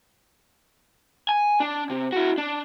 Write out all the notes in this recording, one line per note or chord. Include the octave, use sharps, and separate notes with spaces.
G#5
D4
C3
E4 F#4
D4